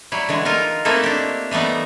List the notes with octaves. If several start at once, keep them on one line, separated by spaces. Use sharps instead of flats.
F#3 G3 E4
D3 E3 G#3
D#4 F4 A#4 F5
A3 A#3 C4 D#4 E4 A4
D4 G4
E3 G3 A3 B3 D#4